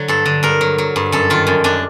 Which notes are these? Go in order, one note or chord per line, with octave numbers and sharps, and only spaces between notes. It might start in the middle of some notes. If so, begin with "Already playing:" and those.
Already playing: D3 F#3
G2 A4
D3
G2 A#4
F#3
F#3
G2
F#2 A4
D#3 F4
F#2
F#2 D4